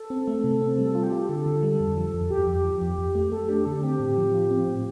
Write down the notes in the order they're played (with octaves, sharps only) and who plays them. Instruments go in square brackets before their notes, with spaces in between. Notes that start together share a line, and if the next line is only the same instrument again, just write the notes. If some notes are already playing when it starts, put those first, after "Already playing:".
Already playing: [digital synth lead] A4
[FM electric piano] C4
A3
C3
C4
[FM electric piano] G3 [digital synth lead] A4
[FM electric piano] F4 [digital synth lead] A4
[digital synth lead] G4
[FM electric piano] F4
[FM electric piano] D3 [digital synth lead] A4
[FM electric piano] D3
G3
F2
F3
F2
[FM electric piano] F2 [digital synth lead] G4
[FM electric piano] F2
F3
F2
F2
A3
[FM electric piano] A3 [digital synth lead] A4
[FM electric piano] D4 [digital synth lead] G4
[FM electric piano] D3 [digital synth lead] A4
[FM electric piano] C4 [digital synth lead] G4
[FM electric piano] A2
F3
F4
C4
A2